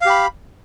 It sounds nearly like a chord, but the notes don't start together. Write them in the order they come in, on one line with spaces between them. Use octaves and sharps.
F5 G4 B5